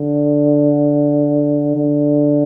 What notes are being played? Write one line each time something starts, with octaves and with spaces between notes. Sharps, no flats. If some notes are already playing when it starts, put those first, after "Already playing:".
Already playing: D3
D3